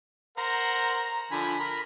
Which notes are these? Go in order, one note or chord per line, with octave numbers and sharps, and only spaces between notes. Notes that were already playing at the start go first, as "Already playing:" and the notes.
A#4 C5 F#5 A#5
D3 F3 G#5 B5
A#4